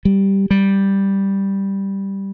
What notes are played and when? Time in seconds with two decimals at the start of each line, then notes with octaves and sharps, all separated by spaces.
0.05 G3
0.51 G3